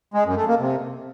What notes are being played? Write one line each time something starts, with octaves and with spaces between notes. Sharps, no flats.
G#3
F#2
A3
A#3
C3